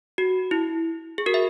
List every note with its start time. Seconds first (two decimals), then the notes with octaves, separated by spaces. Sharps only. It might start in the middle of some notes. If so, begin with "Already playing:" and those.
0.18 F#4
0.51 E4
1.18 G#4
1.26 F#4 A#4
1.34 E5